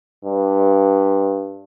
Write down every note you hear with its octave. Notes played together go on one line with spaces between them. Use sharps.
G2